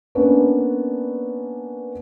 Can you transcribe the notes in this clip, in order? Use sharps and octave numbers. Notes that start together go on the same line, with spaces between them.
A#3 B3 C#4 D4 B4